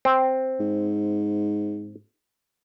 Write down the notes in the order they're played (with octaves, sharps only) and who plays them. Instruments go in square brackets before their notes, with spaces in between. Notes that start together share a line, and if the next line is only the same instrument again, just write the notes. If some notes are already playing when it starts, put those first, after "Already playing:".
[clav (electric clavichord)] C4
[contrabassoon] G#2